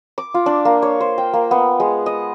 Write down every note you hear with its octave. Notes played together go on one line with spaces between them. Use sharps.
D6
F4
D4
A#3
C#5
C5
G5
A#3
B3
G#3
D#5